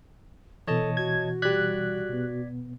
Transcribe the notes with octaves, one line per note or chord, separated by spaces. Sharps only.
B2 E3 A4 C#5 D#5 A5
F#4 G#6
G3 D5 F#6 G#6 B6
B2 B3